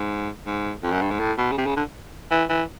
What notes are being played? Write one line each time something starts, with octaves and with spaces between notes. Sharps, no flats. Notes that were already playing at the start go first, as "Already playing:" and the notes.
Already playing: G#2
G#2
F2
F#2
G2
G#2
A2
B2
C#3
C3
C#3
D3
E3
E3